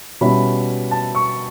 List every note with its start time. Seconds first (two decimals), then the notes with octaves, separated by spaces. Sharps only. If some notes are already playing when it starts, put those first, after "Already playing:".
0.21 B2 G3 C#4 E4 B5
0.91 A5
1.15 C#6